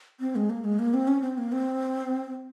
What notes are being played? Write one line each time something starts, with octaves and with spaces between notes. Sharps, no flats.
C4
G#3
A#3
G#3
A#3
C4
C#4
C4
A#3
C4